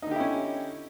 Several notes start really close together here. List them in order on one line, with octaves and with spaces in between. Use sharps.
D#4 D3 G4 E4 C#4